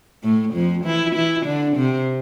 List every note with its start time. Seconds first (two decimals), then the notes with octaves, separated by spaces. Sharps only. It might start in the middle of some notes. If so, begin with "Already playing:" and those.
0.23 A2 A3
0.53 F2 F3
0.85 E3 E4
1.15 E3 E4
1.46 D3 D4
1.77 C3 C4